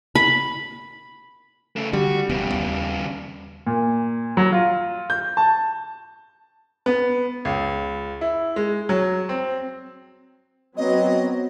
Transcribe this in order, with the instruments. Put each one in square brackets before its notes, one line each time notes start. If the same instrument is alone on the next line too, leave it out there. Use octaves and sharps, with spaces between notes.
[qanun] B5
[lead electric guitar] C#3 A3
[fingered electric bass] D3 [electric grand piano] G3 [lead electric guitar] F#4
[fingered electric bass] E1 B3 [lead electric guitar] G2 C#3
[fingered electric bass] D#2
[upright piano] A#2
F#3
F4
G6
A5
B3
C#2
E4
G#3
F#3
C4
[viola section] F#3 B3 C4 [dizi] D#5